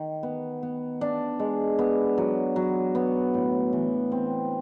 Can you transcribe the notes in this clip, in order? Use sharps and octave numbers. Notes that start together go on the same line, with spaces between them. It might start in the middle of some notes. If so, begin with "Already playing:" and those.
Already playing: D#3
B3
B3
D4
G#3
B3
F#3
F#3
B3
A2
E3
C4